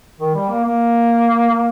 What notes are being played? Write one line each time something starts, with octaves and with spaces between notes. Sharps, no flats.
D#3
G3
A#3
A#3